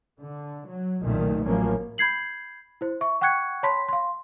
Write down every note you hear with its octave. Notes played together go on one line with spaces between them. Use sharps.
D3
F#3
F#1 B1 A#2 D#3 A3
A1 A2 F3 F#3 A#3 C#4
B5 G6 G#6 C7 F#7
E4 C5
E5 C#6
F#5 G5 C#6 F#6 G#6 C#7
C#5 A5 B5 C6 B6
F5 C6